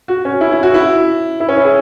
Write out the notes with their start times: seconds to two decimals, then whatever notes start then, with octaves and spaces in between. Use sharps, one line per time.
0.08 F#4
0.25 C#4
0.41 E4
0.52 E4
0.63 F#4
0.74 E4
1.40 E4
1.49 C#4
1.57 E4
1.65 G#4